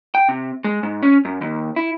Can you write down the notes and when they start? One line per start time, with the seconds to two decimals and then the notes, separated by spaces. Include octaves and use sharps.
0.15 G5
0.29 C3
0.64 G#3
0.83 G#2
1.03 C#4
1.25 F#2
1.41 D#2
1.76 E4